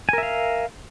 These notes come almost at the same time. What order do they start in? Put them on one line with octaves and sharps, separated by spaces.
G#5 A#4 E5 F5